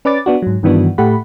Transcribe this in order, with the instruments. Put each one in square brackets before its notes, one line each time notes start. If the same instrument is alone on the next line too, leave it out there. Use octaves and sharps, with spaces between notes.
[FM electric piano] C#4 B4 D5 D6 A6
B3 D4 F#4
G#2 F#3
G2 D#3 E3 B3 D4 F#4
A2 A3 G4 F#5 B5